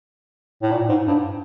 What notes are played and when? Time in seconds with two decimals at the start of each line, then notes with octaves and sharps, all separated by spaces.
0.62 A2
0.71 A#2
0.89 G#2
1.07 G2